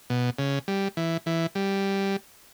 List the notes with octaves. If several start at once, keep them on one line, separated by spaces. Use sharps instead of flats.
B2
C#3
G3
E3
E3
G3